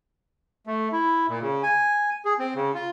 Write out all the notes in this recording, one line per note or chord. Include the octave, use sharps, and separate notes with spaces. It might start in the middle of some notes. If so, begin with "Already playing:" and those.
A3
E4
A#2
C#3
G#5
G#4
C4
C#3
F4